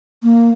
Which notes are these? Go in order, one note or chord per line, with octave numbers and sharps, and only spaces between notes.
A#3